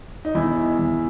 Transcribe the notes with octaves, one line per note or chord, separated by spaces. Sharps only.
D#4
E2 E4
E2